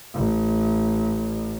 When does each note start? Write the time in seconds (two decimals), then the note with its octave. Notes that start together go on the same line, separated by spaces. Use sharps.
0.15 A1